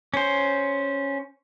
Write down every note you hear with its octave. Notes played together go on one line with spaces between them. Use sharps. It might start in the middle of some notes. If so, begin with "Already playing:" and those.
C#4 C5